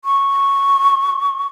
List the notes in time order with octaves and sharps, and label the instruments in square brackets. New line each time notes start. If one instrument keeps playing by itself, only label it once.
[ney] C#6